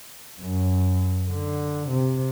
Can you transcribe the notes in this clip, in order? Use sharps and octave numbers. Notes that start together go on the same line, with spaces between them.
F#2
D3
C3